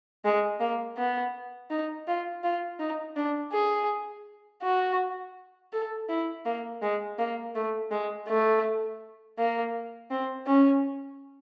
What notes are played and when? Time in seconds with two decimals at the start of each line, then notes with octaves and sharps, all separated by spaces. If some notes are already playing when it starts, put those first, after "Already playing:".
0.25 G#3
0.60 A#3
0.97 B3
1.70 D#4
2.07 F4
2.44 F4
2.79 D#4
3.16 D4
3.53 G#4
4.62 F#4
5.72 A4
6.09 E4
6.45 A#3
6.82 G#3
7.18 A#3
7.55 A3
7.91 G#3
8.28 A3
9.38 A#3
10.11 C4
10.47 C#4